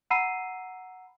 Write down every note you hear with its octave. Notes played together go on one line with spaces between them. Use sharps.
F#5 A#5 B5 E6 C7 D#7